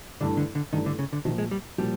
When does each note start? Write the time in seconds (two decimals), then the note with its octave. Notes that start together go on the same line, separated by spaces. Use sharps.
0.20 G2 D3 E3 A3 D4
0.37 D3
0.55 D3
0.73 G2 D#3 E3 A3 D4
0.86 D3
0.99 C#3
1.13 D3
1.25 A#1 A#2 D#3 F3
1.38 G#3
1.51 G3
1.78 A#2 F3 G3